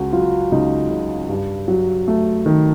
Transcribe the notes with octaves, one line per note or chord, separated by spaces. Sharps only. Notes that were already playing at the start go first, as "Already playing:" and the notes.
Already playing: C#2 F#4
F#3 F4
C#2 D#4
C#3
G2
F#3
A3
D#3